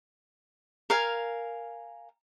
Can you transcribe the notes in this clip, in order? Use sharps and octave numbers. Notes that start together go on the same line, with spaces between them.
A#4 F5 G#5